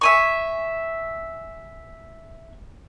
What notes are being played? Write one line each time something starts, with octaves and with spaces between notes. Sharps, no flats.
E5 G#5 C#6